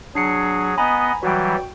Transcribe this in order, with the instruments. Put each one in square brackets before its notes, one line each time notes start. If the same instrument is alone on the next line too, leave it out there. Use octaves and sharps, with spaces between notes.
[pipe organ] F#3 G#4 [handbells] D4 C7 C#7
[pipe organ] B3 D#5 [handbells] G#5 A#5 B5
[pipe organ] E3 F#3 G3 [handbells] F#4 G5